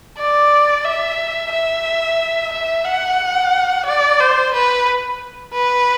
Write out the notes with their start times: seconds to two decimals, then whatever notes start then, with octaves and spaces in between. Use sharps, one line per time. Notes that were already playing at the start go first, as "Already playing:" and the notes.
0.18 D5
0.85 E5
1.52 E5
2.53 E5
2.85 F#5
3.86 D5
4.20 C5
4.53 B4
5.54 B4